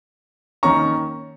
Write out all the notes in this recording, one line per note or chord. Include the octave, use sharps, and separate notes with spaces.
D#3 A#3 C#4 A#5 C#6